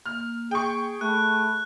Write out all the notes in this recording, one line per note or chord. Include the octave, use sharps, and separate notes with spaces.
A#3 F6
G#4 G5 C#6
A3 G#4 A5 B5 F#6